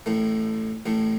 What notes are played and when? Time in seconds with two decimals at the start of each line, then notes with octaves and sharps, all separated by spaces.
0.06 A1 A2 A3
0.86 A1 A2 A3